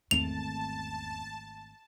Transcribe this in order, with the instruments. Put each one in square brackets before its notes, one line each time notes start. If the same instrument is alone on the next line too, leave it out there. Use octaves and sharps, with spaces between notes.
[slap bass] G#1 A3 C4 [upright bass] E2 [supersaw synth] A5 [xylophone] F7